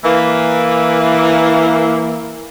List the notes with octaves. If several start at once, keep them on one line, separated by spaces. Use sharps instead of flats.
E3 A#3